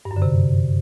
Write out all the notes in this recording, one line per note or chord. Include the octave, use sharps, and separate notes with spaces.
G2
F#2
D3
C3